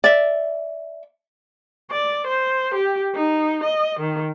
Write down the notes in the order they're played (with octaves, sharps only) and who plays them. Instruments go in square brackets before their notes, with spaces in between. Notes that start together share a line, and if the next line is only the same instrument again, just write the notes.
[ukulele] D5 E5
[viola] D5
C5
G4
D#4
D#5
D#3